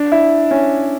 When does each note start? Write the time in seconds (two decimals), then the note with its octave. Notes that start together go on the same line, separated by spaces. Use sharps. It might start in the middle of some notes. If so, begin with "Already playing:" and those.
Already playing: D4
0.12 E4
0.51 C#4